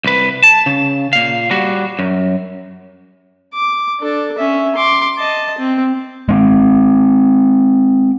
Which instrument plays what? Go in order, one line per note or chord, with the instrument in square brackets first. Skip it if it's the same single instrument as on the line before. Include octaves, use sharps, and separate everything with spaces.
[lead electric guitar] C2 B4
A5
C#3
A#2 F5
G3 F#4
F#2
[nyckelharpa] D6
D4 A4
C#4 E5
C6 D6
D#5 A5
C4
[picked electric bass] G#3 B3 C4